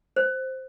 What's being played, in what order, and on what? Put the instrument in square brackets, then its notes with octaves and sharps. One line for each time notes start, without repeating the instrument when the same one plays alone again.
[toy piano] C5